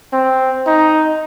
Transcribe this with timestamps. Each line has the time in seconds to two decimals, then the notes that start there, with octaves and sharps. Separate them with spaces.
0.13 C4
0.67 D#4